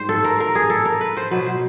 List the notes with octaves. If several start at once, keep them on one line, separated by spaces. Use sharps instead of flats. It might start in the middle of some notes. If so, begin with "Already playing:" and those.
Already playing: G#2 G3 C5
A4
A#4
A#4
G#4
A4
A#4
B4
C5
B2 F#3 B4
C5